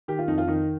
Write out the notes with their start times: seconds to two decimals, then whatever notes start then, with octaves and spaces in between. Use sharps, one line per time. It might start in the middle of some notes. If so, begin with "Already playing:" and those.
0.08 D#3 G4
0.19 F4
0.28 F2 D#4
0.38 F4
0.48 D#3 D#4